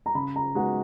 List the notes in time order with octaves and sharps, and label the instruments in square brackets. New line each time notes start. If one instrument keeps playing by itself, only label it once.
[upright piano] A#5
[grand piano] C#3 [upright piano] B5
[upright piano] A#5
[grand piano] G#3 B3 D#4 F#4 [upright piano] F#5